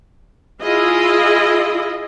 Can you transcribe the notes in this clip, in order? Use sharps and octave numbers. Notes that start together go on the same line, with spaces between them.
E4 F4 G#4 D#5